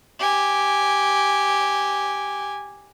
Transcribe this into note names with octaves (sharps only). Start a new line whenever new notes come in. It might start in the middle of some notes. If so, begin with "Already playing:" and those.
G4 G#5